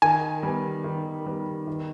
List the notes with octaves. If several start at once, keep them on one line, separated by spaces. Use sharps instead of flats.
D#3 G#5
G3 B3
D#3
G3 B3
D#3